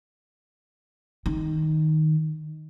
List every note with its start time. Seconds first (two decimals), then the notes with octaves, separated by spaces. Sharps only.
1.26 D#3